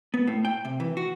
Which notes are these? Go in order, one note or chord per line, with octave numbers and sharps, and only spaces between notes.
B3
A2
G5
C3
E3
F#4